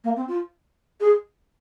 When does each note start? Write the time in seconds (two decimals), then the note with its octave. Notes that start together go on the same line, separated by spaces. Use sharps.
0.04 A#3
0.16 C4
0.28 F4
1.00 G#4